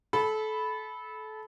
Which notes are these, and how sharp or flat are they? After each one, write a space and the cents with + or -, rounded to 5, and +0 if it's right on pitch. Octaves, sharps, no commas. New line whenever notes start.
A4 -25 B5 +0